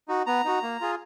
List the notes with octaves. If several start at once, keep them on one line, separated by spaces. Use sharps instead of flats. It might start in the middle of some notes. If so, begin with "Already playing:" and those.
D#4 F#4
B3 A#5
D#4 F#4
A#3
F4 G#4